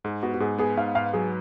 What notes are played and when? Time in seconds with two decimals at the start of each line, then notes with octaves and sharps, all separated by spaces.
0.04 G#2 G#4
0.23 B3 F#4
0.34 F#4
0.40 G#2 G#4
0.58 B3 G#4
0.77 G#2 F5
0.95 G#2 F5
1.13 F#3 G#4